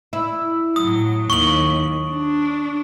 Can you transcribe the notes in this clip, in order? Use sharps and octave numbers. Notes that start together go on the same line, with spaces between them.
E4
A2 F#3 D#6
D#2 C#6 F#7
D4